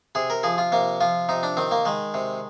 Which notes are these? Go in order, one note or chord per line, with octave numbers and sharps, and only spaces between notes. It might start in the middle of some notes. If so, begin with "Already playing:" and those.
C3 G#4
A#4
F3 G#4
F4
C3 A#3
F3 F4
C3 D#4
D4
D#3 C4
A#3
D#3 G#3
C3